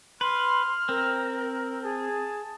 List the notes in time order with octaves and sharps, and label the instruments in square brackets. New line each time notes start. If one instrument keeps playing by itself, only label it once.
[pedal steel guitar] B4 [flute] C6 [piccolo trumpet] F6
[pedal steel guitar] C4 [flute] A#4
[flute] G#4 [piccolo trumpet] A5